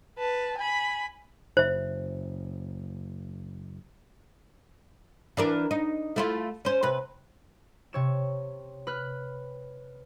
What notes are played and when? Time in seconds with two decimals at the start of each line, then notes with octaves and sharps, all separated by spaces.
0.18 B4 A5
0.58 G#5 B5
1.57 F#1 C5 E5
5.37 E3 D4 A#4
5.71 D#4
6.16 A3 E4 F4
6.65 C#4 C5
6.83 C3 B4
7.93 C3 C#5 E7
8.87 B4 F6 F#6